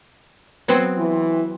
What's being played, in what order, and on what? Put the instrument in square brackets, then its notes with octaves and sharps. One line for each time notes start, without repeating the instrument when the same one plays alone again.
[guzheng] F#3 B3 C4
[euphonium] E3